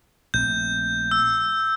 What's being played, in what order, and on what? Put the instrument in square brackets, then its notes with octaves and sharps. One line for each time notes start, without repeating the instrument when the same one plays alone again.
[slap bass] A#1 A3 C4 [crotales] G6
[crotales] E6